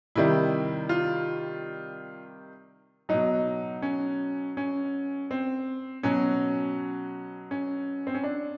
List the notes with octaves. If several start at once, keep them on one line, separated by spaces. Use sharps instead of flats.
C3 D#3 G3 E4
F4
B2 F#3 D#4
C#4
C#4
C4
B2 F#3 C#4
C#4
C4
C#4
D4